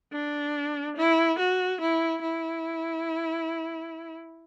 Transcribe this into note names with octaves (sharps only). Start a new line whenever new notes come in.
D4
E4
F#4
E4
E4